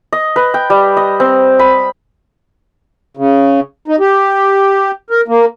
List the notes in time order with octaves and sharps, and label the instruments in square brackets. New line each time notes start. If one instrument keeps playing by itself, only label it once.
[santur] D#5
B4
G5
G3
D#5
C4
B5
[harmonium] C#3
D#4
G4
A#4
A#3